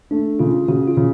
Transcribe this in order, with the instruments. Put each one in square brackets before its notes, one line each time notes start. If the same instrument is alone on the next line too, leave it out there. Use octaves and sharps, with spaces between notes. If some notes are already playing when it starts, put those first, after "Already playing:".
[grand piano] A3 [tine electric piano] D4
[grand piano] C#3 [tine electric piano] F4
[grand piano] C#3 [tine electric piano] F#4
[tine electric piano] F4
[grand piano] C#3